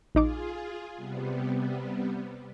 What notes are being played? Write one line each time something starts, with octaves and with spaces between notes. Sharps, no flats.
A#1 D#4 F4 G#4 D6
C3 G3 B3